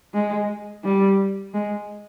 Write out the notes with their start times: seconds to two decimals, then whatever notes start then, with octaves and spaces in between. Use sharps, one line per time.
0.14 G#3
0.84 G3
1.54 G#3